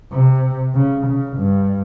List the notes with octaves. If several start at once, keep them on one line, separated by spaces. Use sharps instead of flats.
C3
C#3
C#3
G2